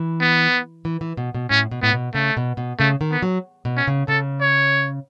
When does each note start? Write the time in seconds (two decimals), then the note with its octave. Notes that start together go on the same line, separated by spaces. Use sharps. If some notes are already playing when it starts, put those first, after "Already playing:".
Already playing: E3
0.20 B3
0.85 E3
1.01 E3
1.17 B2
1.34 B2
1.50 A2 C#4
1.71 B2
1.82 A2 B3
1.93 B2
2.14 C#3 A3
2.37 B2
2.57 B2
2.79 C#3 A3
3.01 D#3
3.11 B3
3.22 F#3
3.65 B2
3.77 C#4
3.87 C#3
4.08 C#3 A4
4.41 C#5